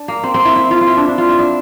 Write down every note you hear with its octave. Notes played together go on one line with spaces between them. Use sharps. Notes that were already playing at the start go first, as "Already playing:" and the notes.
Already playing: D4
A#3
C4
C4
E4
E4
F4
F4
E4
D4
D4
F4
E4
D4